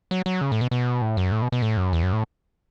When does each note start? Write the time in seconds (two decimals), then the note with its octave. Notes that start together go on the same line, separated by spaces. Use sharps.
0.11 F#3
0.26 F#3
0.41 C#3
0.52 A2
0.61 B2
0.71 B2
1.02 A2
1.17 F#2
1.32 A2
1.42 B2
1.52 B2
1.62 A2
1.77 F#2
1.93 E2
2.03 F#2
2.13 A2